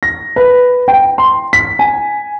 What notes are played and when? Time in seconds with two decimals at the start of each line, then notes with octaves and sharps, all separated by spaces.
0.03 A#6
0.36 B4
0.88 G5
1.18 C6
1.53 B6
1.79 G#5